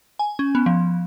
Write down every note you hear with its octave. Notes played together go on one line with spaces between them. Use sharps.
G#5
C#4
B3
F3